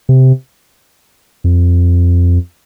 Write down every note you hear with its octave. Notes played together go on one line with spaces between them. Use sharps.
C3
F2